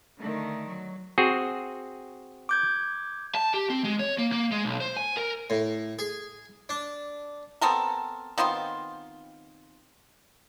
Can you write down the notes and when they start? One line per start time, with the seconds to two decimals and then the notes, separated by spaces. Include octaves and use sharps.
0.19 D3 D#3 A3
0.65 F#3
1.18 C4 F#4 G#4
2.49 D6 G6 G#6
3.35 A5
3.54 G4
3.70 C4
3.84 G#3
3.99 C#5
4.18 A#3
4.32 A#3
4.52 G#3
4.65 B1
4.80 C5
4.97 G#5
5.17 A#4
5.50 A2
5.99 G#4
6.69 D4
7.61 B3 C4 A4 A#4
8.38 D#3 B3 C4 F4